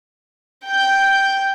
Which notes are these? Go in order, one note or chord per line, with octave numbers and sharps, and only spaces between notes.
G5 G6